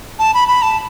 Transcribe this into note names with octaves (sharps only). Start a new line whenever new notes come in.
A5
B5
B5
A5